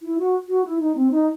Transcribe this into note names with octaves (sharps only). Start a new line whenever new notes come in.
E4
F#4
F#4
E4
D#4
C4
D#4